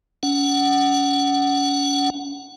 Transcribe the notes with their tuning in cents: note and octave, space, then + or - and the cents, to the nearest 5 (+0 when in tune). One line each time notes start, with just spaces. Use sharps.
C#4 +30 F#5 +15